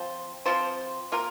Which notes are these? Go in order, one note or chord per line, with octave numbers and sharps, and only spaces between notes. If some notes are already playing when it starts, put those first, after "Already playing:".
Already playing: F3 C4 F4 C5
F3 C4 F4 C5
A#3 F4 A#4